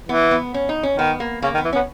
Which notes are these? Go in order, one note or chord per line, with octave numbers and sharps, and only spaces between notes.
E3 B3
B3
C#4
D#4
C#4
D#3 B3
A#3
C#3 A#3
D#3
B3
E3
C#4
B3